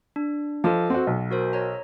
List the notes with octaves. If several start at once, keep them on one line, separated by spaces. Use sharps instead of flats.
D4
F3 A4 D#5 D6
C4 F#4 F#5
B1
F#4 A#4 C5
C#5 A#5